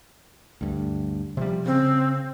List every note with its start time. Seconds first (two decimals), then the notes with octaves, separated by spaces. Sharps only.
0.61 D2 G2
1.37 C3 F3 G3
1.66 C#3 C4